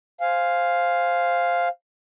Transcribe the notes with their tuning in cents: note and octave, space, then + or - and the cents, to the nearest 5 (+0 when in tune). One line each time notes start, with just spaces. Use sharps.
C5 +0 F5 +0 G#5 +0